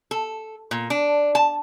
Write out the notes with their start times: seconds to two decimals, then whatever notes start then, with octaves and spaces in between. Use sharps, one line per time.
0.11 A4
0.71 A#2
0.90 D4
1.35 A5